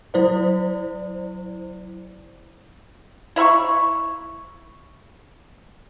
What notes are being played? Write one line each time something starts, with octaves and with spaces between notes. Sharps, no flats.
F#3 E4 C5 D5
E4 E5 B5 C#6